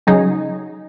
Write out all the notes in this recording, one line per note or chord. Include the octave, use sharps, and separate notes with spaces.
C#3 F#3 D#4 G#4